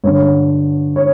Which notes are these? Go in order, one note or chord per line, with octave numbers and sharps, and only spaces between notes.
G2 D3 C#5
C#5